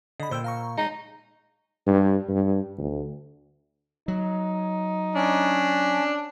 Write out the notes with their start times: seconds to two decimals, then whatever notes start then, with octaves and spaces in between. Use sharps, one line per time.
0.20 D3 D#5 B5
0.31 A#2 C5 G5 E6
0.44 F5 A#5 C#6
0.78 G#3 D#4
1.87 G2
2.29 G2
2.78 D2
4.08 F#3 D#4
5.15 C#4 D4